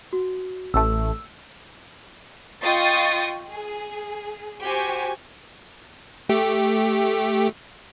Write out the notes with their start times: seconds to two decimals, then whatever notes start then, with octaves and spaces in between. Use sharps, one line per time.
0.13 F#4
0.74 A1 A3 E6
2.64 F4 D#5 G5 C#6 D#6 A6
3.49 G#4
4.63 F#4 G4 C5 G#5
6.29 A3 G4